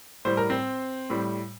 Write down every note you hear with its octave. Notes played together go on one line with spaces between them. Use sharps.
A2 G3 C5
A#4
C4 C5
A2 G3